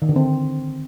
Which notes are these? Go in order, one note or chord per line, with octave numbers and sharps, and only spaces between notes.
D#3
D3
C4